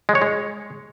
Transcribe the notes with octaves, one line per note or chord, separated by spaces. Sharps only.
G#3
C#5
G#3